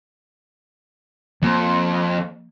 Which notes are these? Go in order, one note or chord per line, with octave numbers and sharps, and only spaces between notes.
F2 F3 A#3